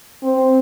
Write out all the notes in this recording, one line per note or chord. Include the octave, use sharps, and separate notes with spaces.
C4